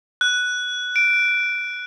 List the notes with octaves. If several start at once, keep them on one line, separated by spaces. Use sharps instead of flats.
F#6
D7